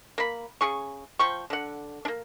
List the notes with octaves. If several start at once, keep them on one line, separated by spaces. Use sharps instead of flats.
A#3 B5
C#3 G#4 C#6
F3 C5 G5 C#6
D3 F#5
A#3 D4